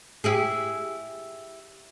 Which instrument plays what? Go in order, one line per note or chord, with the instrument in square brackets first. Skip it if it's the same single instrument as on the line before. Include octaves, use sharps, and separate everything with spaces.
[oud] E4 G4 G#4